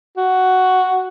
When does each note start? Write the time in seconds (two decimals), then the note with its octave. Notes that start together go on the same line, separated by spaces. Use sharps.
0.17 F#4